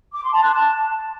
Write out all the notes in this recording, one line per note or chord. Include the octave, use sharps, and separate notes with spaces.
D6
C6
A5
F#6
A5